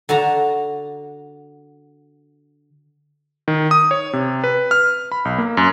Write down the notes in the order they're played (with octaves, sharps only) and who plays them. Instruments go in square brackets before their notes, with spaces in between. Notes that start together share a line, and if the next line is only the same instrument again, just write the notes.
[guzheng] D3 F#4 A5 A#5
[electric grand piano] D#3
D#6
C#5
C3
B4
F6
B5
B1
A#3
F#2